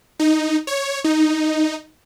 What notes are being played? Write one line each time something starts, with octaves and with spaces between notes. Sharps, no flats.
D#4
C#5
D#4